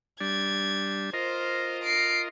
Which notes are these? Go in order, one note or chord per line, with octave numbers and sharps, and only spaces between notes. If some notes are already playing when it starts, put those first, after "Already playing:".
G3 D4 G#6
F4 A#4 C5 D#5
C7 D7